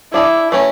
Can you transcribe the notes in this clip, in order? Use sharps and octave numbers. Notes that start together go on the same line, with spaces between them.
D4 E4 G#4 D5
E3 A3 C#4 F#4